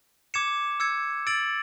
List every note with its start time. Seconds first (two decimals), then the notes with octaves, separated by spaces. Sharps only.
0.34 D6 G#6 C#7 E7
0.80 E6 G#6 C#7
1.27 E6 A6 D7 F#7